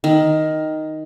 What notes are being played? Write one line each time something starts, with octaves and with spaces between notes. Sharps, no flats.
D#3